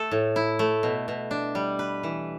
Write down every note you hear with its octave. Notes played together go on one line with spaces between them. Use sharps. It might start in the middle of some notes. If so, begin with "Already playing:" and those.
Already playing: A3 A4
A2
E4
A3
B2
B2
D4
G3
B4
E3